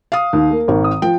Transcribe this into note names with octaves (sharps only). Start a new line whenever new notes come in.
F5 D#6
D#2
A#3
G#1 D#3
D#6
F3 G5